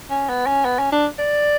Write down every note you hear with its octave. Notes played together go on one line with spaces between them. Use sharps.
C#4
B3
C#4
B3
C#4
D4
D5